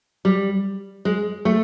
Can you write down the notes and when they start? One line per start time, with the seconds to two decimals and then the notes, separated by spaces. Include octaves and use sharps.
0.25 G3
1.05 G#3
1.45 A3